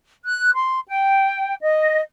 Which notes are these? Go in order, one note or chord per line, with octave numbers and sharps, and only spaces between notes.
F#6
C6
G5
D#5